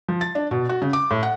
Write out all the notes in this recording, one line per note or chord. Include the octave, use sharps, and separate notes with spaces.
F3
A6
D4
B2
F#4
C#3
D6
A2
F#5